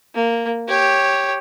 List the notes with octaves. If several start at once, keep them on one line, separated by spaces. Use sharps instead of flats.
A#3
G4 C#5